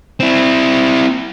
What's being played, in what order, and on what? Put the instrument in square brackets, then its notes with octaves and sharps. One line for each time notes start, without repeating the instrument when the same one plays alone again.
[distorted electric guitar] C4 E4